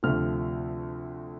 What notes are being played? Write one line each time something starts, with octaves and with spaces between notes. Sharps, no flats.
D2 C3 F3 A3 F6